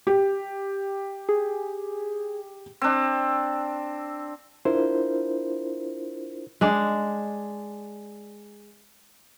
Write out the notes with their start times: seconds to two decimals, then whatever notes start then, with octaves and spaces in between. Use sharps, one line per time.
0.07 G4
1.29 G#4
2.81 C4 D4
4.65 D4 E4 F4 A#4 C5
6.61 G#3 D4